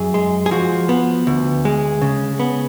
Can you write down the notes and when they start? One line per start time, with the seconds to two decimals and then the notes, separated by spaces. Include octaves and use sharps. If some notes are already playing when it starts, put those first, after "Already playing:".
Already playing: F#2 G#4
0.14 G#3
0.46 G#4
0.51 F3 F#4
0.89 B3
1.27 D2
1.65 G#3
2.02 C#3
2.40 B3